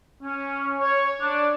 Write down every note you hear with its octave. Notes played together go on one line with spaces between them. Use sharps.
C#4
C#5
D4